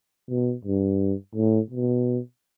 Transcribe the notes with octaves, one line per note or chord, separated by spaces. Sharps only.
B2
G2
A2
B2